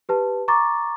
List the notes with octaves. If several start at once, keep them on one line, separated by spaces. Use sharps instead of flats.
G4 B4 A5
A#5 C#6 D6 A6